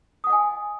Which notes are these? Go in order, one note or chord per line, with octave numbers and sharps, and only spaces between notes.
D#5 F#5 G#5 D#6